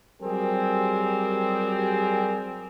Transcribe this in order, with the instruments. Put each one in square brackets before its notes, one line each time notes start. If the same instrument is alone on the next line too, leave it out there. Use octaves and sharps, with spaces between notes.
[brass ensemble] F#3 G3 C4 G4 G#4 A#4